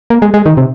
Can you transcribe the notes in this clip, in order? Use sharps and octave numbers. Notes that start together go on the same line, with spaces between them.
A#3
G#3
G#3
D#3
C3